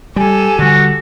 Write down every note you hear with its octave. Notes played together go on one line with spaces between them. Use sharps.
G3 G4 A4 G#5
D3 G3 F#4